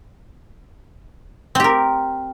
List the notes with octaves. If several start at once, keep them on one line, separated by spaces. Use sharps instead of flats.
C4 G4 A#4